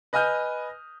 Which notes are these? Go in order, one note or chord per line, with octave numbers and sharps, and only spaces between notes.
B4 D#5 G#5 D#6 F6 G6